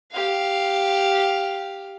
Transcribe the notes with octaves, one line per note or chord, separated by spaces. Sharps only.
G4 F5